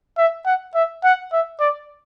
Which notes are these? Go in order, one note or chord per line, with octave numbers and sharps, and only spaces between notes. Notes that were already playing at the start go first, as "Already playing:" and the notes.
E5
F#5
E5
F#5
E5
D5